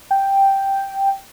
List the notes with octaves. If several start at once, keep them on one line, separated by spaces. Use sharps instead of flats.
G5